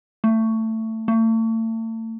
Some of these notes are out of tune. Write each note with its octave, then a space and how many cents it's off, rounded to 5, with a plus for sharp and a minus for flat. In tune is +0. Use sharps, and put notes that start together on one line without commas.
A3 +20
A3 +40